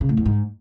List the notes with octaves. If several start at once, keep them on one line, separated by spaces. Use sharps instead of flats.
C#3
A2
E2
G#2